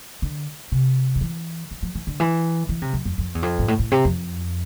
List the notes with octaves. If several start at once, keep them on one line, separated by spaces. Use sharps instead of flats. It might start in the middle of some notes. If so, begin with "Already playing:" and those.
D3
C3
F3
E3
E3
F3
E3
D3
E3
E3
C3
F2
F2
F2
E2
F2
G#2
A2
A2
C3
F2